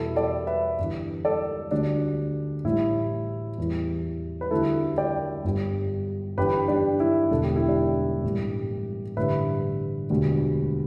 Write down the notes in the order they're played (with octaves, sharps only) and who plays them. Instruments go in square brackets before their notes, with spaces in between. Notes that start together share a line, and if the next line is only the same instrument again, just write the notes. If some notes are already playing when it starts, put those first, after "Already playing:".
Already playing: [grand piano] E2 B2 G3 E4 A4
A4 D5
B4 E5
G1 G2 E3
A4 D5
D2 D3 G3 D4
A1 A2 G3 E4
E2 E3 G3
B4
D2 D3 G3 E4 A4
D5 G5
G1 G2 G3
G1 G2 E3 G4 B4
D4 G4
E4
E1 E2 D3 A4
G4
E4
D4 G4
A1 G2 G3
A1 G2 D3 G3 B4 E5
E1 D2 D3 G3